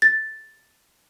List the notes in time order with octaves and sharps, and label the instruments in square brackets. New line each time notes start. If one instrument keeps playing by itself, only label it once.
[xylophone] A6